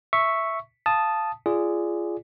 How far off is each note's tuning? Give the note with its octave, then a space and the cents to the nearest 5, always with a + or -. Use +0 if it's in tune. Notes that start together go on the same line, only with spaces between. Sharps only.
E5 +0 C#6 +0
F5 -10 A5 -5 D#6 -5
F4 -25 G#4 +0 D5 +0